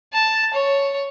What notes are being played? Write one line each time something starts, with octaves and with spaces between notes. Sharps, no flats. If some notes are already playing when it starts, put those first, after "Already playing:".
A5
C#5